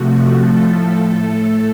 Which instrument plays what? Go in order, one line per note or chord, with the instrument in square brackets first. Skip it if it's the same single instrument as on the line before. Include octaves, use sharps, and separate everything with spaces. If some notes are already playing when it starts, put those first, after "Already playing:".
Already playing: [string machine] C3 F3 A3 F#4
A2 F3 A3 A4
A2 A3